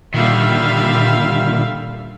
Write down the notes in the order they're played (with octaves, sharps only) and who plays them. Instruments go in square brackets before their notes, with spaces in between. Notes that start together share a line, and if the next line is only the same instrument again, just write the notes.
[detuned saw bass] A#2 [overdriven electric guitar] D3 D#3 [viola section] G3 E5 F5